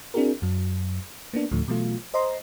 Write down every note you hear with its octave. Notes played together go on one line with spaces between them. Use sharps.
C4 D4 E4 F#4 G#4 A#4
F#2 F#3
A#3 B3 D4
D2 A2 D3 F3 A3
B2 E3 F#3 A3 F4
C5 D#5 A#5 C6